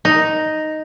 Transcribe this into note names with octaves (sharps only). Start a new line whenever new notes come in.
D#4